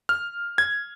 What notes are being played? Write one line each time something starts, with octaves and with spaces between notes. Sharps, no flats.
F6
G#6